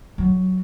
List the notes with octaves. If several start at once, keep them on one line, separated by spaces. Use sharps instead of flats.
F#3